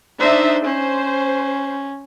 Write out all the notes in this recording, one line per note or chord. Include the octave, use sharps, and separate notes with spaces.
D4 D#4 C5 E5
C#4 C5